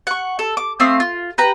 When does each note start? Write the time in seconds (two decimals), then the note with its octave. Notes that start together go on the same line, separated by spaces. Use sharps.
0.07 F#5 C#6
0.39 A4
0.57 D6
0.80 A3 C4 F5 D#6
1.00 F4
1.38 G4 B4 A#5